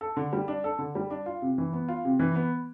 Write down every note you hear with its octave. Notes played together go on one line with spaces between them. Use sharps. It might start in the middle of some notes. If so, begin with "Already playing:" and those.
A4
D3
G3
D4
A4
D3
G3
D4
F4
C3
E3
B3
F4
C3
E3
B3